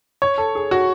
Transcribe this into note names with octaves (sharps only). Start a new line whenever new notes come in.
C#5
A4
G#4
F#4